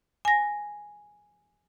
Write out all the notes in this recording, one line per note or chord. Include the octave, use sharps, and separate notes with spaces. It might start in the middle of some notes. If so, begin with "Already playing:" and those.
G#5 A#6